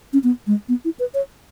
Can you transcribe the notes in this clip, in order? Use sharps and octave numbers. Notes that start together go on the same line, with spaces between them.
C#4
B3
G#3
B3
E4
B4
C#5